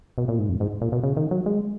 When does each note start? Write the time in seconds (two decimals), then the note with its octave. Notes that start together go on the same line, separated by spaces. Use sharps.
0.18 B2
0.28 A#2
0.39 G#2
0.49 F2
0.60 G#2
0.81 A#2
0.92 B2
1.03 C#3
1.17 D#3
1.31 F#3
1.46 G#3